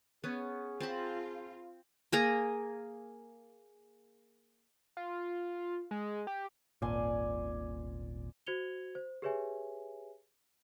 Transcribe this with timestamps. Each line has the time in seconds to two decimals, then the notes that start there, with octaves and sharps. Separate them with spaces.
0.24 B3 C#4 G#4
0.80 C4 F4 A5 B5
2.12 A#3 G#4 A#5
4.97 F4
5.91 G#3
6.27 G4
6.82 D#1 G#1 A#2 D5 G#5 C6
8.47 F#4 C5 G#6 C#7 F7 G7
8.95 C5
9.22 G4 G#4 B4 C#5 E5 G#5